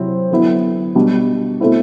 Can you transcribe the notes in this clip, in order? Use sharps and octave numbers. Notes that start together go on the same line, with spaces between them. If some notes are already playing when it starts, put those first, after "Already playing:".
Already playing: C3 F#3 C4 E4
D3 F#3 B3 E4
B2 G3 D4
B2 A3 C4 E4